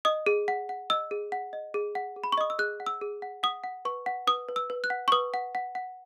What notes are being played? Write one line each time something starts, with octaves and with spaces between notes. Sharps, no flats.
D#5 D#6
G#4
F#5
F#5
D#5 E6
G#4
F#5
D#5
G#4
F#5
G#4
B5
C#6
D#5 D#6
E6
G#4 F#6
F#5
E6
G#4
F#5
F#5 D#6
F#5
B4 C#6
F#5
B4 D#6
B4
E6
B4
F#6
F#5
C#6
B4 D#6
F#5
F#5
F#5